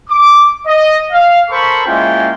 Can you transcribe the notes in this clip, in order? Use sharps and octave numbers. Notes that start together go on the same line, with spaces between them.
D6
D#5
F5
A4 A#4 C5 B5 C#6
G#3 A#3 C#4 E4 F4 G5